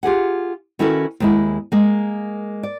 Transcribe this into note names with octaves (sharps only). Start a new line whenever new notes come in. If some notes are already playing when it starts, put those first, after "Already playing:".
F4 G4 G#4 F#5
D#3 C#4 E4 F#4 A4 B4
D#2 G#3 E4
G#3 A#3
D5